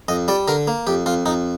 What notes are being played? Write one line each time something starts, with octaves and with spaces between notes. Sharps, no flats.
F2 D#5
G3 D5
D3 A#4
A#3
F2 G4
F2 F4
F2 D#4